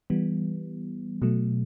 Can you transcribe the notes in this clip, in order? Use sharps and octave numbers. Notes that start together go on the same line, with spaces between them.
E3 G3 B3
B2 F#3 A3